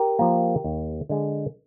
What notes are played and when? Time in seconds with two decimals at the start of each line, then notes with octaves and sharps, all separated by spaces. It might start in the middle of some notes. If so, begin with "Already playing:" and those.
Already playing: G4 A#4
0.19 F3 A#3
0.64 D#2
1.09 D3 G#3